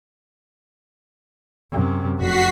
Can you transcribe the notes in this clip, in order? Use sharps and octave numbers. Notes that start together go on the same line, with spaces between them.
F#2 C3
F1 F#4 B6 C7